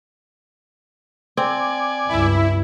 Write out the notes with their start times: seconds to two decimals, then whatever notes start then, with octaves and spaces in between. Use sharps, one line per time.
1.37 C4 D5 G#5
2.09 C#2 G2 E4